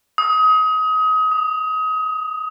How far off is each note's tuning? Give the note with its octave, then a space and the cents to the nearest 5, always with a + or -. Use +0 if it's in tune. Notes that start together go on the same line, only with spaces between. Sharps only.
D#6 +30
D#6 -15